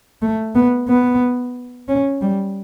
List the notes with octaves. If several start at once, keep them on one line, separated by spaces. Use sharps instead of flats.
A3
B3
B3
C#4
G3